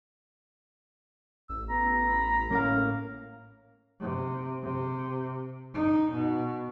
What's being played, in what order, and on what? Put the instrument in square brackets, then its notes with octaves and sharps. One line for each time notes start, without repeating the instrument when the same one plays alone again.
[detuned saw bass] A1 [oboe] E6
[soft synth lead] B3 [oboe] A#5
[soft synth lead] B5
[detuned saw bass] A2 [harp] A#3 A#4 F5 [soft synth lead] C#4
[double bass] C3
C3
D#4
B2